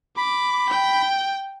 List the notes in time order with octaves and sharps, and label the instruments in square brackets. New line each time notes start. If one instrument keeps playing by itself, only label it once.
[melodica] B5 [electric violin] D6
[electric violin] G5